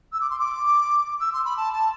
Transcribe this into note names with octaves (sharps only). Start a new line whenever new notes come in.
E6
D6
C6
D6
E6
C6
B5
A5
A5